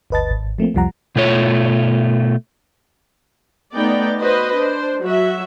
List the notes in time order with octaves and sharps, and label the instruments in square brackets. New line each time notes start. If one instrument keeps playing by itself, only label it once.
[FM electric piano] G1 D2 B4 D#5 A5 A6
G#1
F3 A3 A#3 C4
C2 F2 F3 G3 F#5 A#5
[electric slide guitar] B2 A3 F4 C#5
[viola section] A3 B3 D#4 D5 G5
F#4 B4 C5 D#5
D4 C5
F#3 F#4 E5